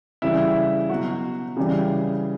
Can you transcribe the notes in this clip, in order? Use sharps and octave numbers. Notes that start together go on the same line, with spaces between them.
C#3 E3 G3 E4
B2 F#3 F#4
C#3 E3 G3